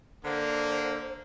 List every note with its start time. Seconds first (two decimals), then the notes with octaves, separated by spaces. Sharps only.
0.25 D3 A#3 C5